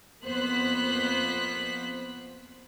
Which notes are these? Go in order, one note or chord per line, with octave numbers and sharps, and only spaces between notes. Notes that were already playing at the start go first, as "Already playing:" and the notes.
F2 A#3 B3 C5 F#6 B6